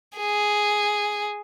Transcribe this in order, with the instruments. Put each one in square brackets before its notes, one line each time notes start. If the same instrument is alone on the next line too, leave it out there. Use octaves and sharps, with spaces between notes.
[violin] G#4